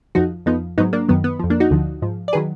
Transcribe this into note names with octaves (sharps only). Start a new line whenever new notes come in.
F2 F3 D#4 F#4
F2 F3 B3 D#4
G#2 F#3 B3 D#4
A#3 D4
F#2 D#3 F#3 B3
B3
F2 F3
A#3 D4
D#4 F#4
D2 D3 F3
G#2 F3
D5
D#3 F#3 G#4 B4